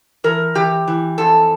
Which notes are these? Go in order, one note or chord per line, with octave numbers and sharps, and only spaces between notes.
E3 A#4
E3 G4
E3
F2 A4